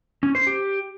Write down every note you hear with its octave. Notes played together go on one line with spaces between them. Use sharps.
C#4
C5
G4